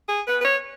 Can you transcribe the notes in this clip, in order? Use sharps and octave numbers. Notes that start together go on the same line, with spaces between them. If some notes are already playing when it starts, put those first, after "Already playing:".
G#4
B3 B4
B4
C#5